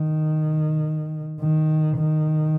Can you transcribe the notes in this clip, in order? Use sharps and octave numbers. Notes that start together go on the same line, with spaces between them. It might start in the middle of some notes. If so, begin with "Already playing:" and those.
Already playing: D#3
D#3
D#3